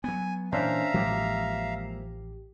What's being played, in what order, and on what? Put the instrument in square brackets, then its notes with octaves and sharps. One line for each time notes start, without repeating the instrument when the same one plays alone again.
[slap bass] F#3 B3 [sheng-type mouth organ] G#5
[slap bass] A#2 E3 [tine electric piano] C#4 D4 C5 [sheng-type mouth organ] E5 F5 A#5
[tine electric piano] A1 G4 [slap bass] F3 G#3 A#3